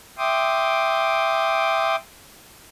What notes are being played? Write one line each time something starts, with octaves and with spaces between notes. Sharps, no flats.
E5 G5 C6 D6 D#6